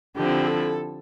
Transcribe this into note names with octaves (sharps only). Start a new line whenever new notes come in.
D3 F3 C4 E4 G4
A4